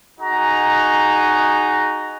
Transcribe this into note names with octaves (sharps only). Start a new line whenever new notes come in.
D#4 F#4 G#4 A#5